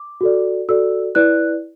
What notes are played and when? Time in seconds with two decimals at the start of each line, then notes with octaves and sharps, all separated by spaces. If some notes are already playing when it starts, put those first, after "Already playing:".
Already playing: D6
0.21 F#4 A4 D5
0.69 F#4 A4 D5 E6
1.15 E4 B4 D5 F#6